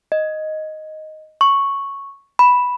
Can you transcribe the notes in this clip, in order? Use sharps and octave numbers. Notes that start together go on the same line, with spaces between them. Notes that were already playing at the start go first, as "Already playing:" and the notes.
D#5
C#6
B5